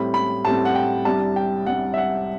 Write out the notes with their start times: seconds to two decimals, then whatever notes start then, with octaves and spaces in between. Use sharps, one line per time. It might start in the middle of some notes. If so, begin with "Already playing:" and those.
Already playing: A2 G3 C4 B5
0.14 B5
0.45 A2 G3 C4 A5
0.65 F#5
0.75 G5
1.05 C2 C3 G3 D4 A5
1.36 G5
1.66 C2 C3 G3 D4 F#5
1.94 E5
1.98 F#5